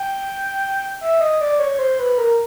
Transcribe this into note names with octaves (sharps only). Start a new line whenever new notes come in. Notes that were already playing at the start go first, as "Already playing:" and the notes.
Already playing: G5
E5
D#5
D5
C#5
C5
B4
A#4